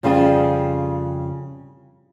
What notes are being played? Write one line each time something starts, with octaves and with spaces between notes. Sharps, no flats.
F2 C#3 G3 F4 G#4 G5